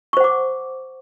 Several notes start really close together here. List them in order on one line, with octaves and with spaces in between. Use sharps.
C#6 C5 F#5 D6